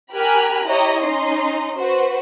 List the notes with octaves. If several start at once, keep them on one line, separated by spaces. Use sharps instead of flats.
G4 A#4 G#5 B5 F6 F#6
E4 G4 C#5 D#5 A#5
C#4 D#4 D#5 C6
F#4 B4 C5